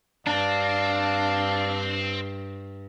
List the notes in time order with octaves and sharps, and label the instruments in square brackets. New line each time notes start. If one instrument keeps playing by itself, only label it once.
[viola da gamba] G2 [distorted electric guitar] C4 [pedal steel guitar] D4 [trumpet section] D5 F5 A5